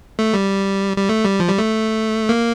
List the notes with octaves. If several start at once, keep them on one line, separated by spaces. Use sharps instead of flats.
A3
G3
G3
A3
G3
F3
G3
A3
A#3